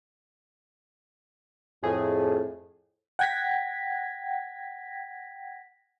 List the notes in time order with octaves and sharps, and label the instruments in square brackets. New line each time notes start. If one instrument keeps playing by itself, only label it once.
[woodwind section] F2 A2 [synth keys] G#4
[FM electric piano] F#5 G5 G#6 A#6 B6